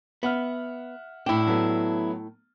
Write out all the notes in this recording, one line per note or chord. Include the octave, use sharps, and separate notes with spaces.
B3 E5 F#5 F6
A2 D4 E4 G5
F#3 A3 B3